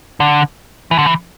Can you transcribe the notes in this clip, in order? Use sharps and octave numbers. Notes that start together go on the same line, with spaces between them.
D3
E3
D3
E3